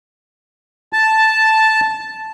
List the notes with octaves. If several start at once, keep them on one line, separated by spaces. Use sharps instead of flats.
A5